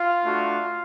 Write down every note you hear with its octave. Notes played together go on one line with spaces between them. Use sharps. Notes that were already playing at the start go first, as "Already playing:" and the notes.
Already playing: F4 F5
A3 D4 F#4